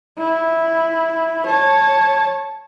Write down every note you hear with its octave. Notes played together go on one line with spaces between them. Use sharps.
E4
C#5 A5